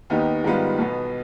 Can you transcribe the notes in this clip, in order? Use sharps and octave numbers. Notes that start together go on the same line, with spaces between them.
D#2 D#3 B3 D#4 G4
G#2 D#3 G3 B3 F4
B1 B2 B3